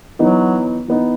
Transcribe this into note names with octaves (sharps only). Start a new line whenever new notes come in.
E3 F#3 B3 D#4
E3 B3 D#4